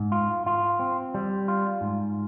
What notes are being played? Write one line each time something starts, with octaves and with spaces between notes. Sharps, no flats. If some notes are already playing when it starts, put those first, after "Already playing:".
Already playing: G#2
F4
F4
C4
G3
F4
G#2